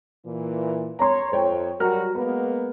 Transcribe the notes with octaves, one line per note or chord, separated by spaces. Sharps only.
A#2 E3
C#5 A#5 C6
F2 C5 C#5 G5
F#3 G3 F#4 A#4 A#5 F6
G#3 A#3 B3 B4